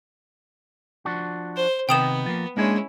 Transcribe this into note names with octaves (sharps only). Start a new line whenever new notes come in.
F3 D4 F#4
C5
C3 D#3 B3 D#4 G5 D#6 E7
F3 A#3
G#3 A#3 C#4 D4 E4 G#5